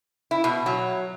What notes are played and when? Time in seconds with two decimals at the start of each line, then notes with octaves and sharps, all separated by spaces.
0.31 E4
0.44 B2
0.66 F#3